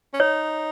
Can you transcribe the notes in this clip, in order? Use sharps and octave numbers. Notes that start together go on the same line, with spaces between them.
C#4
D#4 C#5